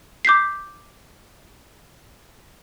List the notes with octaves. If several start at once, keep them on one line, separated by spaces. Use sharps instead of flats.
D6 G6 B6 C7